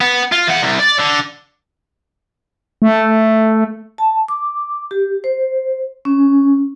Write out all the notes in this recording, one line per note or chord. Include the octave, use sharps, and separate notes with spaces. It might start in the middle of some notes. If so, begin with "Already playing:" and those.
B3
F4
E3 F#5
C2
D5
D3
A3
A5
D6
G4
C5
C#4